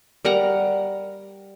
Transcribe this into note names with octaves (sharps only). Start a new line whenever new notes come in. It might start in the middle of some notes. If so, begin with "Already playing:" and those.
G3 A#4 F#5 A#5